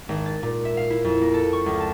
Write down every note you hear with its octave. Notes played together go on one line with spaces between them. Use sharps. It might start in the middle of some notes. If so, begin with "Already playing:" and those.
G#1
A6
A#2
E5
F5
E4
F2
A#3
A4
C#6
C#2
A5